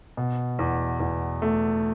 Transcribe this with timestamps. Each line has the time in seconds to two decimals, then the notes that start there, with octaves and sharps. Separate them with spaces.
0.17 B2
0.59 E2
1.00 E2
1.42 A3